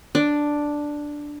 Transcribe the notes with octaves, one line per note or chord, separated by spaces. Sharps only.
D4